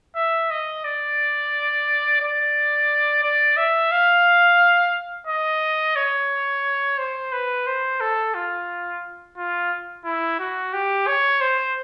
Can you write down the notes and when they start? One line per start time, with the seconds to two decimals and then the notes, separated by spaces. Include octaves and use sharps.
0.16 E5
0.51 D#5
0.84 D5
2.21 D5
3.23 D5
3.57 E5
3.92 F5
5.27 D#5
5.96 C#5
6.98 C5
7.33 B4
7.67 C5
8.01 A4
8.35 F4
9.38 F4
10.05 E4
10.40 F#4
10.74 G4
11.07 C#5
11.41 C5